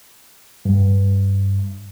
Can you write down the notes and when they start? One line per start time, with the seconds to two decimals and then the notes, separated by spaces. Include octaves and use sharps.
0.65 G2